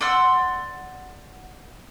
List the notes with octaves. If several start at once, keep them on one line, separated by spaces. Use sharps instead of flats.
D5 F#5 C6 E6